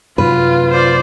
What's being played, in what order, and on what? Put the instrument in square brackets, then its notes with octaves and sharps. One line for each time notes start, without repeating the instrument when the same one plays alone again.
[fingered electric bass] F#2 C3 F#3 [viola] F4 [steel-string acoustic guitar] B4
[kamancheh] C5 D5